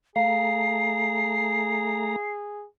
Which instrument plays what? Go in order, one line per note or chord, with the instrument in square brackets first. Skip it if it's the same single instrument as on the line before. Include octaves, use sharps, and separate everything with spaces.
[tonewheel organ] A3 A#5 [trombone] G#4 [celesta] F5 [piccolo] C7